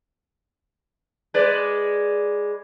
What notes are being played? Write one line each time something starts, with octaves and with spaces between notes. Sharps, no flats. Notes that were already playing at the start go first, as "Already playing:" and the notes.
G#3 B4 D5